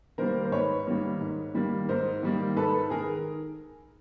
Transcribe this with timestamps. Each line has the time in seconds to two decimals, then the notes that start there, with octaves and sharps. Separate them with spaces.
0.18 D#3 G3 A#3 A#4 C5
0.45 C5
0.52 G#2 B4 C#5
0.86 D#3 G3 A#3
1.21 G#2
1.54 D#3 G3 A#3
1.89 G#2 A#4 C5
2.23 D#3 G3 A#3
2.56 G#2 A4 B4
2.90 D#3 G#4 A#4